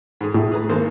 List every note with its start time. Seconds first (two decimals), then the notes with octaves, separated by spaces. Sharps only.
0.21 G#2 G#4
0.34 A2
0.52 G#4 B4 A#5
0.69 G#1 A#3 C5